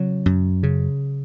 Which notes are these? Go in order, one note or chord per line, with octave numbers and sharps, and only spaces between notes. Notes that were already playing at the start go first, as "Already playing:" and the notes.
Already playing: C#3 F#3
F#2
C#3